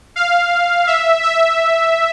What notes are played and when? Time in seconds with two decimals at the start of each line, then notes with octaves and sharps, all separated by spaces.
0.16 F5
0.87 E5
1.23 E5